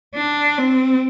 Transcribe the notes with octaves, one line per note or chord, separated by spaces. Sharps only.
D4
C4